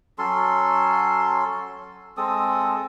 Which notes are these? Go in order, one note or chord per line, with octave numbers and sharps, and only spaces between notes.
F#3 C#4 A4 C6
G#3 C4 A4 D#6